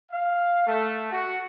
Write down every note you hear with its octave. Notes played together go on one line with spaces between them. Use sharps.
F5
A3
F#4